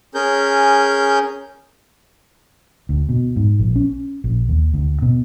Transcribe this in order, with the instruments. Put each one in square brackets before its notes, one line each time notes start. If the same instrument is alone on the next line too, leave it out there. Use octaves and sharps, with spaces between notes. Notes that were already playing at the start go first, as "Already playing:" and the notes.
[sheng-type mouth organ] C#4 G#4 A#4 G6
[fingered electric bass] D2
B2
G#2
A#1
C#4
A#1
D#2
D2
B2